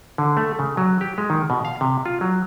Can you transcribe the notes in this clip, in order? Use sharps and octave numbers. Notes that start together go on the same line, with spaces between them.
D3
A3
C#3
F#3
G4
G#3
D#3
B2
F5
C3
F4
F#3